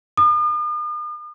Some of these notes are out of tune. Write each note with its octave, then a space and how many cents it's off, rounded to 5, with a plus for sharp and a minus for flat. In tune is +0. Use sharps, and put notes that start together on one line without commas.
D#6 -45